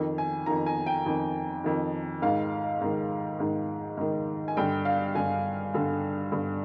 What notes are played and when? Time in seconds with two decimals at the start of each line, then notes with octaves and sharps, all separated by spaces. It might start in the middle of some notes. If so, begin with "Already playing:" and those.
Already playing: F2 D#3
0.18 G#5
0.46 F2 D#3 A#5
0.66 G#5
0.86 G5
1.06 F2 D#3
1.64 F2 D#3
2.22 G#2 D#3 F5
2.81 G#2 D#3
3.40 G#2 D#3
3.97 G#2 D#3
4.48 G#5
4.57 G2 D3 G5
4.85 F5
5.15 G2 D3 G#5
5.74 G2 D3
6.32 G2 D3